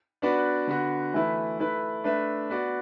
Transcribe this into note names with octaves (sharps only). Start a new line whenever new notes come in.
B3 D4 F#4 B4 D5
D3 B3 F#4
E3 A3 E4 B4
A3 E4 B4
A3 D4 B4 E5
B3 F#4 D5